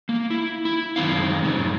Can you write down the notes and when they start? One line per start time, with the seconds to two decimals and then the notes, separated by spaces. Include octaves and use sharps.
0.09 A#3
0.30 E4
0.65 E4
0.96 F#2 D#3 F#3 C4 F5
1.43 F#2 A2 C#3 F#3 G3